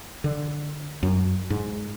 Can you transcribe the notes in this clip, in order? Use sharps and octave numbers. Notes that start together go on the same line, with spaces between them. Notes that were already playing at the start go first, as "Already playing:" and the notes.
D3
F#2
G#2